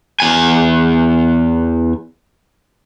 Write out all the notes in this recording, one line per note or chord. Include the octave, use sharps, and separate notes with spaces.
E2 G#5